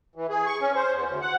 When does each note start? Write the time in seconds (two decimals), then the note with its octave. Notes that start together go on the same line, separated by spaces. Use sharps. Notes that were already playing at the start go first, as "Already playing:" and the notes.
0.16 E3
0.30 G#4
0.46 C#6
0.61 C#4
0.75 C5
0.92 E2
1.07 D2
1.21 F#5